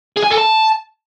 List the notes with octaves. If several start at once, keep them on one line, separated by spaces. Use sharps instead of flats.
G#4
G#5
A4
A5